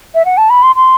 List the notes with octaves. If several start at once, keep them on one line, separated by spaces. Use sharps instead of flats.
E5
F#5
A5
B5
C6
C6